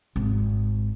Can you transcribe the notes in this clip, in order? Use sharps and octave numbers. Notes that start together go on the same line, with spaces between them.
G#1